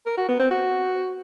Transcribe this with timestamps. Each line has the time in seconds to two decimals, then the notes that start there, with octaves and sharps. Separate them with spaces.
0.06 A#4
0.17 F#4
0.29 B3
0.40 C4
0.51 F#4